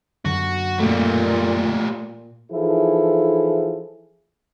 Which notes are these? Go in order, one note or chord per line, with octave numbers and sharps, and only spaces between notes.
F#2 D3 F#4
A#2 A3 G4
E3 F3 D#4 E4 G#4 A4